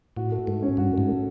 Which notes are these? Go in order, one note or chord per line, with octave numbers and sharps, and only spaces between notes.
A2 F#4
A3
G#2 A3
C#4
G2 F#4
G#2 A3
A3